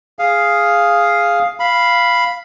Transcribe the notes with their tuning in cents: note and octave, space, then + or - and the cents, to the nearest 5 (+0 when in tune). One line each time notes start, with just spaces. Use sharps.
G#4 +0 F5 +0 D#6 +0
F5 -5 B5 +0